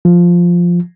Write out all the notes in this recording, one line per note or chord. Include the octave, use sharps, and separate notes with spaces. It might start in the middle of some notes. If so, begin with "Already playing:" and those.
F3